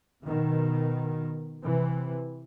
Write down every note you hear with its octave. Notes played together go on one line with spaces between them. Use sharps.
B2 D#3
C3 E3